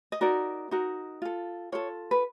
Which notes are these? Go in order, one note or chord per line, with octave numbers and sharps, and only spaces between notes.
D#5
D#4 F#4 A#4 D5
D#4 F#4 A#4
F4 A4
F4 A4 C#5
B4